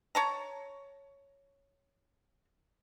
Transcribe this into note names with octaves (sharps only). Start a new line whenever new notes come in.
C#5 A5 A#5